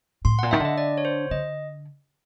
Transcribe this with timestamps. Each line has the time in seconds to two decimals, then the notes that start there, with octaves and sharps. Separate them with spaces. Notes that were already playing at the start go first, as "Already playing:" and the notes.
0.25 A2 C6
0.39 A#2 F#5
0.51 D#3 E5
0.60 D3
0.65 D#5
0.78 D5
0.98 C#5
1.05 C5
1.31 D3 D#5